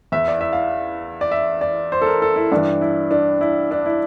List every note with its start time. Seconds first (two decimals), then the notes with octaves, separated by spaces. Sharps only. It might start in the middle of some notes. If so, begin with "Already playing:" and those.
0.12 E2 E3 E5
0.28 D5
0.41 E5
0.53 F5
1.21 D5
1.32 E5
1.61 D5
1.92 C5
2.02 A4
2.06 A#4
2.22 A4
2.36 E4
2.52 G2 E3 D4
2.81 E4
3.11 D4
3.41 E4
3.71 D4
3.86 E4